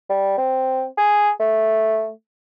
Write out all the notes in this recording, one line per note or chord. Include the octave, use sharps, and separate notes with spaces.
G3
C4
G#4
A3